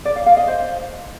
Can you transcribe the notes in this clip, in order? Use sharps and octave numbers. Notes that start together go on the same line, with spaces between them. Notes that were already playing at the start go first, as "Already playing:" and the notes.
D5
F5
F5
D#5
C5